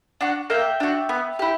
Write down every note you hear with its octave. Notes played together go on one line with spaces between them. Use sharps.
D4 F#4
A#3 E5 G5
D4 F#4
B3
E4 G4